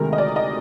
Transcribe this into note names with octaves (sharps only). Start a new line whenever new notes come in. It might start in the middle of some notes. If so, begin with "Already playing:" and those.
Already playing: D2 C3 D#3 G#3 A#4
D#5
D5
D#5